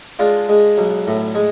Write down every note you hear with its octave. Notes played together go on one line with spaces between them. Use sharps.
G#3 D4 F4
G#3
B1
A2
G#3